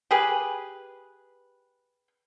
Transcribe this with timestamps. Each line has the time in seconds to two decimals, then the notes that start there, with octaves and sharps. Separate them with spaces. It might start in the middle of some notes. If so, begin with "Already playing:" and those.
0.11 G4 G#4 B4